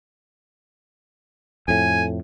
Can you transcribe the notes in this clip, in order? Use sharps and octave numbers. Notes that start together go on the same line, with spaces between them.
F2 A2 G#5